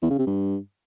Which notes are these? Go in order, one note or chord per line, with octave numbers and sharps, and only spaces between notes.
E2
C#3
C3
G2